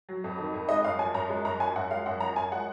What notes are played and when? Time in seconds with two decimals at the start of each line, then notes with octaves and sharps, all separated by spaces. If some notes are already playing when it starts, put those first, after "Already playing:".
0.09 F#3
0.24 F2
0.39 D#3
0.54 F2
0.69 G#3 D#5
0.84 F#2 F5
0.99 F3 G#5
1.14 F#2 A#5
1.29 G#3
1.45 F#2 A#5
1.60 F3 G#5
1.76 F#2 F#5
1.90 G#3 F5
2.06 F#2 F#5
2.20 F3 A#5
2.36 F#2 G#5
2.52 G#3 F#5